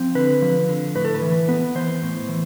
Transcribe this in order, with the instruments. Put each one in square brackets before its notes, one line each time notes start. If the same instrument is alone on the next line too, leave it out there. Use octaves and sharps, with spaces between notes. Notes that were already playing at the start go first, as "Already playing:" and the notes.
Already playing: [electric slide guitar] F3 C4
D3 B4
F3
D3
A2 B4
A4
B4
E3
B3
E3 C5
A2
E3